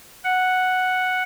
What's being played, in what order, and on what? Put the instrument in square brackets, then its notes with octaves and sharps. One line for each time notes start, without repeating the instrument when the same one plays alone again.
[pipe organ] F#5